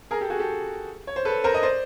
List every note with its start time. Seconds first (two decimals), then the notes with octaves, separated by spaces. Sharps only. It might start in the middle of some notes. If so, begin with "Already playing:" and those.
0.11 G#4 A#4
0.21 G4 A4
0.30 F#4 G#4
0.39 G4 A4
1.07 C#5
1.16 C5
1.25 A4 B4
1.44 A#4 C5
1.54 D#5
1.63 C5 D5